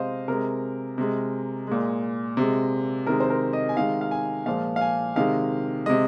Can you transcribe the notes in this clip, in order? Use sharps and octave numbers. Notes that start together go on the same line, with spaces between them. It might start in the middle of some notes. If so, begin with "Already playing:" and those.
Already playing: C3 G#3 C5 D#5 F5
C3 G#3 A#4
C3 G#3
A#2 G#3
C3 G#3
C3 D#3 G#3 A#4
C5
A#4
D#5
G#5
C3 D#3 G#3 F5
F5
G#5
A#2 F3 G#3 F5
F5
G#5
C3 D#3 G#3 F5
C3 G#3 D#5